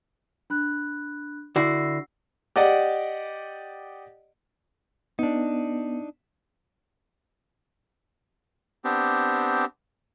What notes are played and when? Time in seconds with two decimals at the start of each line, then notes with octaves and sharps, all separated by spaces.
0.50 D4 B5 F#6
1.56 D3 E4 F#4 E6 A#6 C7
2.56 G4 D5 D#5 F#5
5.19 B3 D4 D#4
8.84 B3 C4 D4 G4